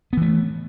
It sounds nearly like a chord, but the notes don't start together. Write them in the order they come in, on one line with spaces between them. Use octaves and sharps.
B3 E3 A3